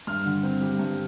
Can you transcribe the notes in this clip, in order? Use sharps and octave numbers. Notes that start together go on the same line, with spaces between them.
G2 F6
D3
C4
G3
G2